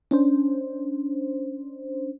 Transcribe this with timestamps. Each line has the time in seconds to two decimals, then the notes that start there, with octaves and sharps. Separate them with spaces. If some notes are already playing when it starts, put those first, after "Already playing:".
0.11 C#4 D4 C5